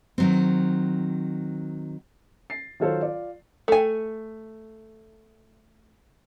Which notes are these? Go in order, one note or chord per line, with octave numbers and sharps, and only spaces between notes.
D#3 F#3 C4
A6 C7
D#3 F#3 F4 A4 C5 C#5
F4 D5
A3 G#5